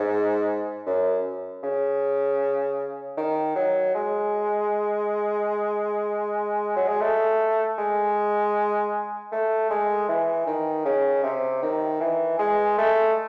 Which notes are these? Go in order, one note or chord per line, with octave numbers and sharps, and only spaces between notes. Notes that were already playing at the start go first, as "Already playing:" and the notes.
Already playing: G#2
F#2
C#3
D#3
F#3
G#3
F#3
G#3
A3
G#3
A3
G#3
E3
D#3
C#3
C3
D#3
E3
G#3
A3